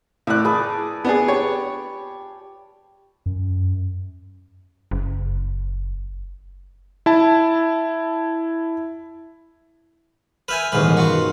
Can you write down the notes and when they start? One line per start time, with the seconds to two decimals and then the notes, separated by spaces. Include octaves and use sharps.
0.27 A2 D5 F5 F#6
0.45 G#4 B4 A5
1.05 B3 D4 G#4
1.28 G4 C#5
3.26 F#2
4.91 F#1
7.06 E4 A5
10.48 B4 E5 G#5 F6 G6
10.72 D#1 A1 G#2 B2 D#3 B4
10.97 G2 F4 F#4